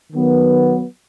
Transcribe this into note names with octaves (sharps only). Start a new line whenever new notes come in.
D#3 F#3 B3